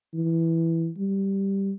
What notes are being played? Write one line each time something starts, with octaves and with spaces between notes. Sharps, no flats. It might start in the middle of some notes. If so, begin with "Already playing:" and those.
E3
G3